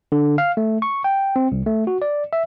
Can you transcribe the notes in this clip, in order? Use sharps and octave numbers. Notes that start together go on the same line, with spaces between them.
D3
F5
A3
C#6
G5
C4
C2
A3
F#4
D5
E5